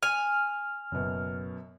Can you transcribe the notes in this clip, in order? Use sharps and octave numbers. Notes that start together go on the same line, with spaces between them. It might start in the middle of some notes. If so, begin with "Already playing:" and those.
G#5 F6
F#1 F#2 B2